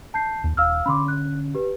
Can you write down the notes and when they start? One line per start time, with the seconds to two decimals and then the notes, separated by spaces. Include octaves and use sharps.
0.14 A5 G6 C7
0.44 D#2
0.57 D#1 F5 E6 F6
0.86 D3 C#4 B5 C6 D6
1.08 F#6
1.55 G4 B4